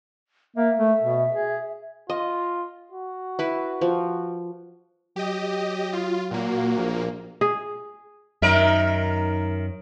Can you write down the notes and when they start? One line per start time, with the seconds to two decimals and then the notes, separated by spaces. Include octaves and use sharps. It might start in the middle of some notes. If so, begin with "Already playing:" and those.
0.56 A#3 E5
0.78 A3
1.01 B2
1.31 G#4
2.10 F4 D#5
2.92 F#4
3.39 E4 B4
3.81 F3
5.16 F#3 G4 D#5
5.93 F4
6.31 A#2 A#3 F#4
6.77 A#1
7.41 G#4
8.42 F#2 D#3 A#4 E5